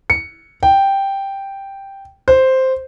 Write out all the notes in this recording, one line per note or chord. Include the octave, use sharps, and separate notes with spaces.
C#7
G5
C5